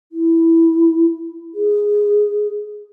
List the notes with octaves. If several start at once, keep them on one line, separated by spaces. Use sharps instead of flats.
E4
G#4